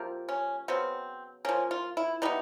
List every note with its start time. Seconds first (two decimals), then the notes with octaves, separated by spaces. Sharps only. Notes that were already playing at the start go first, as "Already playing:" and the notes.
Already playing: C3 F3 A#3
0.29 C#4
0.68 C#3 F#3 B3 C4
1.45 F3 A#3 C#4
1.71 F4
1.97 E4
2.22 E3 G3 B3 D#4